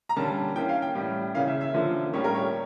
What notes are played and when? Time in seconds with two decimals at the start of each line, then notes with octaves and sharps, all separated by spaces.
0.09 A#5
0.16 D3 G3 A#3 C#4 A5
0.56 E3 A#3 C#4 G5
0.69 F5
0.82 G5
0.95 A2 G3 C#4
1.34 C#3 E3 A#3 C#4 F5
1.48 E5
1.61 E5
1.74 D3 F3 A#3 C#4
2.13 A2 G3 A#3 C#4 C#5
2.24 A#4
2.35 C#5